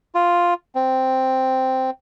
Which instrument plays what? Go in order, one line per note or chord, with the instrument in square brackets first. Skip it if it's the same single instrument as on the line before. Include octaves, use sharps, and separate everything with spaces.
[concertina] F4
C4